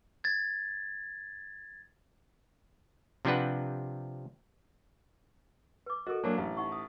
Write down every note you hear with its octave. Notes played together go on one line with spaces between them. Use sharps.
G#6 A6
C3 F3 C4 D4 B4 F#5
B4 D6
F#4 A4 A#4 D#5
F#3 A#3 D4 G#5 A5
A1
D#4 F#5 C#6
D#6